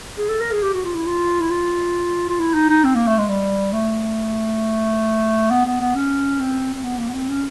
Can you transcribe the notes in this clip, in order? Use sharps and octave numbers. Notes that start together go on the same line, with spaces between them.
G#4
A4
A#4
G#4
G4
F#4
F4
E4
F4
E4
F4
F4
E4
D#4
D#4
C4
A#3
A3
G#3
G3
A3
B3
B3
B3
C#4
C4
C4
B3
A#3
B3
C4
C#4